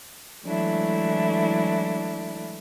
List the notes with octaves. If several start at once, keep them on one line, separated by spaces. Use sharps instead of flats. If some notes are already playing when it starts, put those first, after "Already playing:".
E3 F#3 G#3 A3 D4 E4